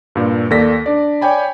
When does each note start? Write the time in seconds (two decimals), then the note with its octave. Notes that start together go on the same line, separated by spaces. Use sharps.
0.15 G2 A#2
0.50 D#2 A#3 A4 D5 A#6 B6
0.86 D4 D5
1.21 C#5 D5 G5 G#5 B5